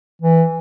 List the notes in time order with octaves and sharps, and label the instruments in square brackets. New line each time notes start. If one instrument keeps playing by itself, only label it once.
[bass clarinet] E3